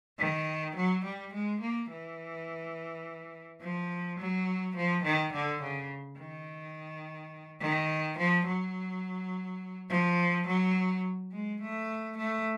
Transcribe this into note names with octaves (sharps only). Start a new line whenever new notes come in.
D#3
F#3
G3
G#3
A#3
E3
F3
F#3
F3
D#3
D3
C#3
D#3
D#3
F3
F#3
F3
F#3
G#3
A3
A3